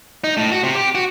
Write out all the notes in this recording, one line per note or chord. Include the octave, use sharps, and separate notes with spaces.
D#4
A2
F#4
C3
G4
F#4